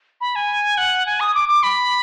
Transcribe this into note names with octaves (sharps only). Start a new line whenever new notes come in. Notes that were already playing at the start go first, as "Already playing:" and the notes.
B5
G#5
F#5
G#5
D#6
D6
D6
B5